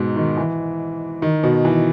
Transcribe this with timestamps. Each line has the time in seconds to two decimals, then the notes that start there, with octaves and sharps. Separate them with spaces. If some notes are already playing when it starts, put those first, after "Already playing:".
Already playing: G#2 B2
0.16 D#3
0.37 E3
1.22 D#3
1.43 B2
1.65 E3